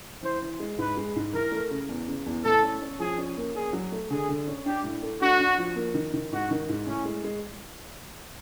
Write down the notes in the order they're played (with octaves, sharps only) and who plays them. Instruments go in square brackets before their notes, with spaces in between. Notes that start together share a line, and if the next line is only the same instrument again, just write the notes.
[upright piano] E3 [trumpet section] C5
[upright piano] E3
G#3
[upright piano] G#2 [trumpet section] B4
[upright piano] G#3
G#2
[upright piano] E3 [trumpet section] A#4
[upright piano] A3
C#3
E2
C#3
E2
[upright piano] A2 [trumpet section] A4
[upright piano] C#4
C#4
[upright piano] F3 [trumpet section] G#4
[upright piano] C#4
A#3
[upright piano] C#4 [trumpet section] G#4
[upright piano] F#3
A3
[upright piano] D3 [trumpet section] G#4
[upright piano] D3
C#4
[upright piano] D4 [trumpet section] G4
[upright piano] A2
A3
[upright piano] D4 [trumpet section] F#4
[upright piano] D4
F3
A#3
D#3
D#3
[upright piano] G#2 [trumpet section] F#4
[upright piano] D#3
G#2
[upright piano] A2 [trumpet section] C#4
[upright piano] G#3
G#3